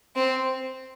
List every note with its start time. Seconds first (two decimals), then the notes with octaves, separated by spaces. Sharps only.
0.16 C4